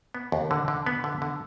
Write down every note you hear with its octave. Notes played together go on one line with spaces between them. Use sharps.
B3
D#2
D3
D3
B3
D3
D3